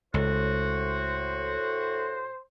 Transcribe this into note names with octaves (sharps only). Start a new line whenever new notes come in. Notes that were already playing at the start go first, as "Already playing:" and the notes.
C#2 A2 F#4 C5